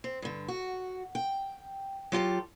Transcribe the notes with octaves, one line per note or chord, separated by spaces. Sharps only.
C4
G2 D3
F#4
G5
F#3 F4 G4 A4